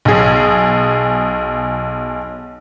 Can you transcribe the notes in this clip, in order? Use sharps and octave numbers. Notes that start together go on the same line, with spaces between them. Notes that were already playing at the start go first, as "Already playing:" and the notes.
B1 G#4